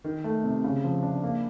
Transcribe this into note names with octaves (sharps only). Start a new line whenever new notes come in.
D#3
A3
C3
C#3
F3
D4
A#3